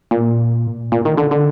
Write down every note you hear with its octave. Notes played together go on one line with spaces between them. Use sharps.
A#2
A#2
D#3
D3
D3